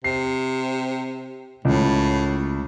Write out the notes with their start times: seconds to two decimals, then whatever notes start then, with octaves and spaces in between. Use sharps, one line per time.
0.04 C3 C7
1.65 C#2 A2